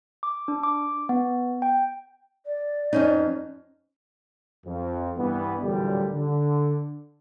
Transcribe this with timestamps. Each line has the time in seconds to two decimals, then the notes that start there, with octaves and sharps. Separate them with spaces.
0.23 D6
0.48 D4
0.63 D6
1.09 B3
1.62 G5
2.46 D5
2.93 F2 C#4 D#4
4.66 F2
5.17 C2 G2 E3 G3 B3
5.63 A1 D2 A#2 D3 F#3 G3
6.14 D3